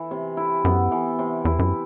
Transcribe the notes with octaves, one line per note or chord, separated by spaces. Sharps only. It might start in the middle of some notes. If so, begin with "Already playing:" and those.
Already playing: E3 E4
C3
E4
F#2 B3
E3
C3
E2 E4
F#2